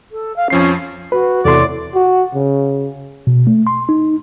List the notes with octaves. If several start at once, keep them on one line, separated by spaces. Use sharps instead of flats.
A4
F5
F2 F3 C#4 C7
F#4 B4
E2 A2 C3 D5 C6
F#4
C#3
B2
A3
C6
D#4